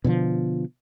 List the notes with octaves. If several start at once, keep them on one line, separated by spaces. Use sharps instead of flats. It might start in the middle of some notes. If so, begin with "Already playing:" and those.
B2 D3 E3 F3